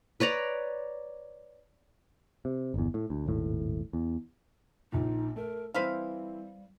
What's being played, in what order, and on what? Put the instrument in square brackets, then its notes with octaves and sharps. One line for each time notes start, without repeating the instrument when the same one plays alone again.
[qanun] B4 C#5 D5 A#5
[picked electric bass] C3
G1 E2
A2
D2
D#1 G#1 A2
E2
[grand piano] A#1 A#2 [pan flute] D#4
[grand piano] A3 [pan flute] A#4
[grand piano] E3 C4 E4 [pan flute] G3 [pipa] B4 C5 F5